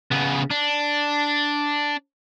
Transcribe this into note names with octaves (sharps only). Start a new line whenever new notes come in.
C#3 B3
D4